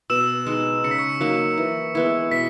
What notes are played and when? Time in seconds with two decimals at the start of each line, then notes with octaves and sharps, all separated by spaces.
0.10 B2 E6 E7
0.46 G#3 D#4
0.84 C#3 C#7
0.91 B6
0.98 C#6 C#7
1.21 F#3 A#3 D#4
1.58 E3
1.95 G#3 B3 E4
2.31 B2 B6